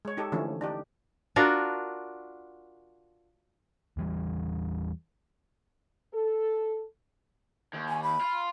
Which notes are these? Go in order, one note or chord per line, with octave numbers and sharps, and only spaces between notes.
G#3 C#5
D#4 G4 A4
D3 E3 F3 A3 C#4
D4 D#4 G4
D4 F4 F#4 A#4
E2 E3 G3
A4
D#2
G#5
B5
F4